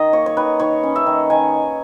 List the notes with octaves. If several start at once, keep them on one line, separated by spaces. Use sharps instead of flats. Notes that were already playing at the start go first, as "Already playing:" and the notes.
Already playing: D#3 D#5
A#3 C#5
C#5
D#3 B4
D#3 C#5
C#4
E5
D#3
D#3 G#5